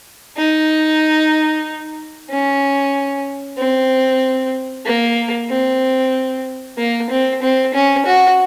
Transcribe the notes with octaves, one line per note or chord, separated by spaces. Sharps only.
D#4
C#4
C4
A#3
C4
A#3
C4
C4
C#4
F#4